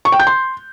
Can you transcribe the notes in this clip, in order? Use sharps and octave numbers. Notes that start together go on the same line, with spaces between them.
C#6
G5
G6
C6